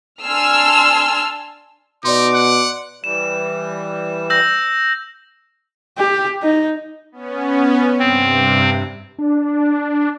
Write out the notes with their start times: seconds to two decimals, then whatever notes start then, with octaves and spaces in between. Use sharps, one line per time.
0.23 D4 G#5 A5 C6 E6 F6
2.05 B2 D#4 D5 C6 D6
2.34 F#5
3.04 E3 G3 E7
4.30 E6 G6 A#6
5.97 G4
6.42 D#4
7.12 B3 C#4
7.99 G2 C3 C4
9.19 D4